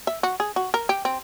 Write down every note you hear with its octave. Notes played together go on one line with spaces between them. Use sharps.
E5
F#4
G#4
F#4
A#4
G4
C4